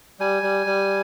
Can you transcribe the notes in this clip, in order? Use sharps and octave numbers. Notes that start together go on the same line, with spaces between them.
G3 G#5
G3
G3